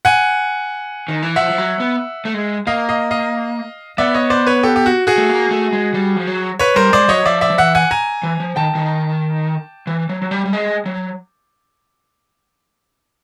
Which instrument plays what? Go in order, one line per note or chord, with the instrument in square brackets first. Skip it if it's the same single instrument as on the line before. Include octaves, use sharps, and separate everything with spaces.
[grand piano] F#5 G#5
[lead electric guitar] D#3
E3
[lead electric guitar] F3 [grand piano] E5 F#5
[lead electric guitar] F3
F#3
B3
A3
G#3
[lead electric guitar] A#3 [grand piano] D#5 F5
[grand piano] D#5 F5
D#5 F5
[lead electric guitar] B3 [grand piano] D5 E5
[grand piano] C#5 D#5
C5 D5
B4 C#5
G4 A4
G4
F#4
F#4 G#4
[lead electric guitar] A3
A#3
A3
G#3
G3
F3
F#3
[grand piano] B4 C#5
[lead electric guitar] G3 [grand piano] A#4 C5
[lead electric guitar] G#3 [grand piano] C5 D5
[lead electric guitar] F#3 [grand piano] C#5 D#5
[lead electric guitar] F3 [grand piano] D5 E5
[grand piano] D5 E5
[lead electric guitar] F3
[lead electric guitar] E3 [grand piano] E5 F#5
[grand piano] F#5 G#5
G#5 A#5
[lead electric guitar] E3
F3
[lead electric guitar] D#3 [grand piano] G5 A5
[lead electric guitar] D#3
E3
F#3
F#3
G3
G3
G#3
F#3